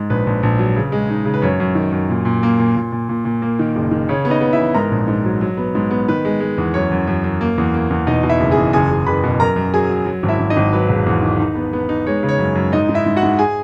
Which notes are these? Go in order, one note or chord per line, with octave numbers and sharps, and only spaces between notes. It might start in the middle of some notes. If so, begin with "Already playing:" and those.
Already playing: G#2
A#1 B4
A#1
A#1
F#3
C#3
G#3
D#4
C#3
B4
F#2 C#5
F#2
D#3
F#2
A#2
A#2
A#3
A#2
A#2
A#2
A#2
A#2
A#3
D#3
F#1
D#3
C#3 C#5
B3
D#4 D#5
B3
E4 E5
E3
G#2 A#4 A#5
A#1
G#2
F#3
F#3
B3
G#2
B3
D#3 B4
G#3
G#3
E2
F#2 C#5
F#2
F#2
F#2
A#3
E2
A#3
E2
B2 D#4 D#5
B2
E4 E5
F#1
G#4 G#5
E2
F#1 G#4 G#5
F#1
F#1 B4 B5
B2
F#2 A#4 A#5
F#2
F#3 G#4 G#5
F#3
F#3
G#1
E4 E5
G#1
D#4 D#5
G#1
F#3 B4
E1
E2
D#3
D#4
B3
B3
D#4
G#3 C#5
C#3
C#5
F#2
F#2
G#2 D#4 D#5
G#2
E4 E5
G#2
F#4 F#5
G#2
G#4 G#5